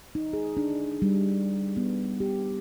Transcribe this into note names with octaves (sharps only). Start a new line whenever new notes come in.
D#4
G#4
D4
G3
B3
G4